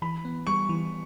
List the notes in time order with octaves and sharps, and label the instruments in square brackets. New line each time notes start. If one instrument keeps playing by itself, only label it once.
[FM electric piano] E3 [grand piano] B5
[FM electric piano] B3
[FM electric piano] G3 [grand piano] C#6
[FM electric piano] E3